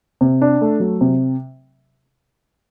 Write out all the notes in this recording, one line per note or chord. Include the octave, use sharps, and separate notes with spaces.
C3
D4
A3
F#3
C3